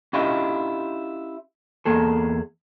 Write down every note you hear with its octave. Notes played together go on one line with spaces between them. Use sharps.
C#4 D4 E4 F4 G4 D#5
E2 A#3 G#4 A4